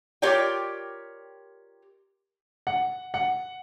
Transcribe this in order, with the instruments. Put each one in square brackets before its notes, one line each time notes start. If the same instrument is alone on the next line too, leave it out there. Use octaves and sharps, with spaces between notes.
[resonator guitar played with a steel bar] F4 G4 A#4 C#5 D5 G5
[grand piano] F#5
F#5